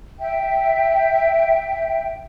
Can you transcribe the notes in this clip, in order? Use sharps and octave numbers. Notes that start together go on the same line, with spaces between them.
E5 G5